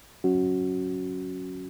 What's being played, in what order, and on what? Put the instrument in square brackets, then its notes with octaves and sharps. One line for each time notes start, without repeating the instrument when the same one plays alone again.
[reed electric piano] F#3 C#4 F#4